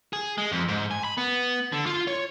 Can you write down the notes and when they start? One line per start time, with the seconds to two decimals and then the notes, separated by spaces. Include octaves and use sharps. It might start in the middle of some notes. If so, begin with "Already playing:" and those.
0.13 G#4
0.38 G#3
0.52 F2
0.68 G#2
0.91 G#5
1.04 B5
1.18 B3
1.72 D3
1.86 F4
2.07 C#5